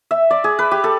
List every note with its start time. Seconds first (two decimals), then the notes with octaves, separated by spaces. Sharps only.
0.11 E5
0.30 D5
0.44 G#4
0.59 B4
0.71 G4
0.84 A4